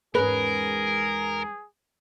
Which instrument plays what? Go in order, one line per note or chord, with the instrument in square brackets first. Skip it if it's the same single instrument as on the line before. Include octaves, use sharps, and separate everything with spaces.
[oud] E2 G#2 C#4 [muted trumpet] G#4 [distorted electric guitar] A#4 [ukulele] B4